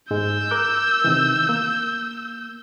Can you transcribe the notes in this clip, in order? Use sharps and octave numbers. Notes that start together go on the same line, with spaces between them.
G#2 G#3 E6 G6
A#4 D6 F#6
C3 D#3 E3
A#3